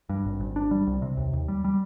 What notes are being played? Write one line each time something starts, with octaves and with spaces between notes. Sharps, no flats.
G2
G#1
G#1
D4
G3
C2
C3
D#2
D#2
G3
G3